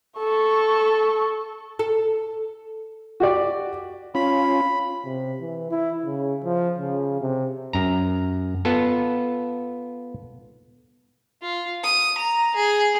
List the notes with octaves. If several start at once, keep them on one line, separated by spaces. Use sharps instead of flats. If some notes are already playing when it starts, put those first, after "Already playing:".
A4 C#6
A4
F#4 G4 D5
C#4 F4 B5
C3
E3
E4
C#3
F3
C#3
C3
F#2 A#5
B3 F4 A4
F4
D#6
A#5
G#4